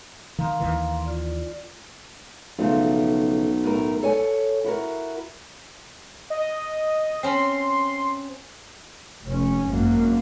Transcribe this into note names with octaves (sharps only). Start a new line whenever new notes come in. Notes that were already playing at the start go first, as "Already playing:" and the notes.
D#3 F5 A#5 C6
D#2 D#3 E3
F4 D5
B1 C#3 F3 A3
A2 A3 A#4
A4 C#5 G#5
E4 F#4 A#4
D#5
C4 C#4 B5 C6
F1 C#4
G#1 F#2 A#3